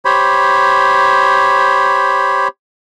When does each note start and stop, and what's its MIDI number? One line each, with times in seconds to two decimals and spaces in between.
0.05 2.48 67
0.05 2.48 72
0.05 2.48 73
0.05 2.48 83